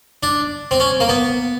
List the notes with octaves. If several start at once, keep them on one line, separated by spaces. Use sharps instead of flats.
D4
C4
C#4
A#3
B3